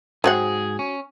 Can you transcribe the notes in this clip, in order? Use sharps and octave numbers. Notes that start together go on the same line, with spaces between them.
G#2 F#3 C4 G#4 F#5
C#4